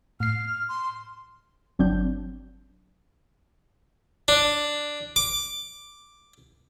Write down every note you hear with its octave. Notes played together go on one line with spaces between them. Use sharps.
A2 F6 C7
C6
G1 F#3 C4 D4 G6
D4
D6